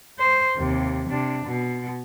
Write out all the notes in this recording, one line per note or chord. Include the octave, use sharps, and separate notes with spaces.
C5
D#2 C3
C3 D4
B2